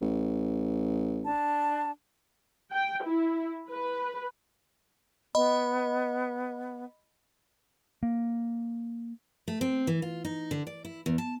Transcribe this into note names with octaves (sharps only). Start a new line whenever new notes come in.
A1
D4 A5
G5
E4
B4
B3 D#5 B5
A#3
A3
C4
E3
F4
D#4
D3
D5
E4
E2
A5